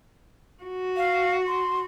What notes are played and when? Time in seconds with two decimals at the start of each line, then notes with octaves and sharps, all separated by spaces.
0.63 F#4
0.97 F5
1.47 C6